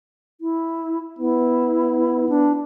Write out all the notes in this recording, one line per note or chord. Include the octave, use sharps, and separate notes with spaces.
E4
B3 E4
D4